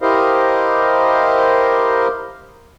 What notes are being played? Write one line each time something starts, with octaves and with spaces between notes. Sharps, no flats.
E4 G4 A#4 C5 D#5 F5